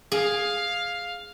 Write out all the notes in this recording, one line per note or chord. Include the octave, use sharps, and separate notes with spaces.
G#4 F5